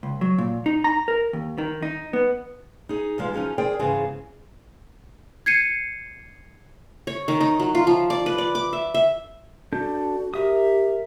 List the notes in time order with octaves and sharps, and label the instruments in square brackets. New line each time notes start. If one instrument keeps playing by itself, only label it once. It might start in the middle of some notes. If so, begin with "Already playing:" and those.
[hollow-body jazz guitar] C#2
F#3
A#2
D#4
A#5
A#4
D#2
D#3
D#4
B3
[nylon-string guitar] D#4 G#4
E2 F3 G#3 F5
F3 C#4 D#4 F#4 G#4
G#4 A#4 C5 D5 G5
G#2 C#3 E3 B3 C4 G#4
[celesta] G#6 C7 C#7 D#7
[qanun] C#5
D#3
D#4
F#3
F4
F3
D5
B4
D5
D6
E5
E5
[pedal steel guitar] D4 A4 G6 [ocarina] F#4
[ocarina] G4 [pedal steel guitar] A#4 E5 D#6